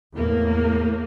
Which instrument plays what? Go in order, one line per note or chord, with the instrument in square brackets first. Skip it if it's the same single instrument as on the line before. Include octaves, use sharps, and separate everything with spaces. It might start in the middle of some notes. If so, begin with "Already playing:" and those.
[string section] E2 A2 A#3